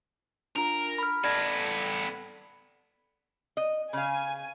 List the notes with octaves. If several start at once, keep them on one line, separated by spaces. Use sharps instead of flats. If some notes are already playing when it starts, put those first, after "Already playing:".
D4 F4 A#4
B5 F6
B3 A4 D5 G#6 A#6
D#5
C#3 F5 G#5